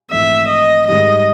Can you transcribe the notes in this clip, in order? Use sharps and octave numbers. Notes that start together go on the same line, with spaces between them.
A#1 G#2 E3 A3 C4 E5
D#5
G#2 D#3 G3 D#5